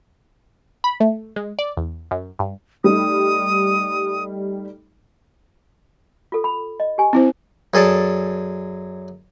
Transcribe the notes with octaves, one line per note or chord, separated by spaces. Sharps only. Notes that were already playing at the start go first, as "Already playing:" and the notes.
B5
A3
G#3
D5
E2
F#2
G2
G3 A3 D#4 D#6
F4 A4
B5
D#5
G4 G#5
C4 E4 C5
F#2 G#4 A4 D5 A5